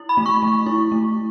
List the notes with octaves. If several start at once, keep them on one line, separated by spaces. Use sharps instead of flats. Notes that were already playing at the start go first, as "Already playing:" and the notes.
Already playing: E4
B5
A3
C#6
A3
E4
A3